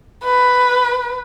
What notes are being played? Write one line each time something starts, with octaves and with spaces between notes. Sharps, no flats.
B4